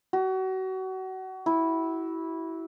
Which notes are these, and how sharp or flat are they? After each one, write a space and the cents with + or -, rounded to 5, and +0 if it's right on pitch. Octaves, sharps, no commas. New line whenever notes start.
F#4 +30
E4 -10